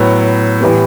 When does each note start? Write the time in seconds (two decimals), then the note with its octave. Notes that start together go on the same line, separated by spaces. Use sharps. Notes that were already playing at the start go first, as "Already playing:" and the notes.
Already playing: A2 F#3 B3
0.61 A2 E3 G3 B3